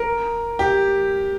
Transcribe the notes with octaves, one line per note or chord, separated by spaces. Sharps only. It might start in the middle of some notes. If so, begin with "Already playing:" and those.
Already playing: A#4
G4